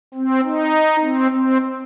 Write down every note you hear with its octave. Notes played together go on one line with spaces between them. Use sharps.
C4
D#4
C4
C4